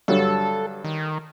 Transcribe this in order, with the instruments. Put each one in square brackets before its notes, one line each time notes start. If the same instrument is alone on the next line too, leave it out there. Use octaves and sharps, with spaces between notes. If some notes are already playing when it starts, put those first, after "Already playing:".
[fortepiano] G2 D3 F#3 [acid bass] A4
[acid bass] D#3